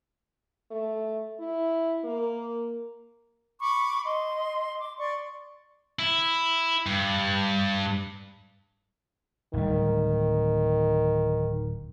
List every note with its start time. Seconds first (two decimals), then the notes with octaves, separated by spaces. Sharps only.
0.71 A3
1.40 E4
2.04 A#3
3.59 B5 C#6 D6
4.04 D#5 C6
4.78 D6
4.98 D5 C6 C#6
5.99 E4
6.86 G2
9.53 D1 D#3 G3